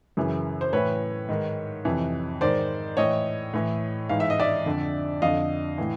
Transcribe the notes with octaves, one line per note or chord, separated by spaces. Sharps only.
F#2 C#3 E3
C5
A2 E3 B4 C#5
G#2 D#3
F2 C3 E3
G#2 D#3 C5 D5
A2 E3 C#5 D#5
A2 E3
G#2 E3 F5
E5
D#5
D5 E5
F2 D3
F2 D3 D#5 F5
A2 E3